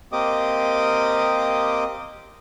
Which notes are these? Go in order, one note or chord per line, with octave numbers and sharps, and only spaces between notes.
A#3 C4 G4 D#5 D6 D#6